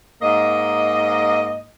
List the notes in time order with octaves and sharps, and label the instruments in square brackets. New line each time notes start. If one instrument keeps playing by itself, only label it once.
[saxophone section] G#2 A#3 D#5